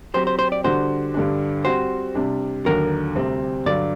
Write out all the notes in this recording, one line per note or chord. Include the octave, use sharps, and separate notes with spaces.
F#3 C4 G4 C5
C5
C5
D5
D3 G3 D4 F#4 C5
G2 D3 G3 D4
G3 C4 F#4 C5
C3 G3 D4
D#2 D3 F#3 A#4
D2 C3 G3 C4
G2 D3 F#3 D5